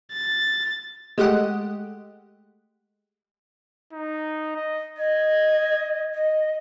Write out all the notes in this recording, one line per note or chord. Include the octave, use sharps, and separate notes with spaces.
A6
G#3 A3 G4 D#5 F#5
D#4
D#5
D#5 G#6
D#5